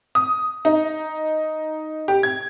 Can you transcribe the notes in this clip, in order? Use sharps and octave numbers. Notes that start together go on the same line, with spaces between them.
D#6
D#4
G4
G#6